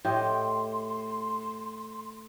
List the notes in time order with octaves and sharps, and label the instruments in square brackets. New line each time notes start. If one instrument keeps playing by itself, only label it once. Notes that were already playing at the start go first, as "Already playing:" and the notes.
[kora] A2 G4 D#5 [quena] C6